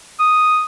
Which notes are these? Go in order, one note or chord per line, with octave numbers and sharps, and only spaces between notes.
D#6